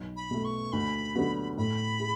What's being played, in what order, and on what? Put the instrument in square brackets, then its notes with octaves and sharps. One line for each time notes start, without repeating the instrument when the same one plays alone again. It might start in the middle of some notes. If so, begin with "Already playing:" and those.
Already playing: [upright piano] B1
[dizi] B5
[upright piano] B2 A3
[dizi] C#6
[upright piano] D2 [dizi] B5
[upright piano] D3 F#3 B3 F#4
[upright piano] A2 [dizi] B5
[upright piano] E4 G#4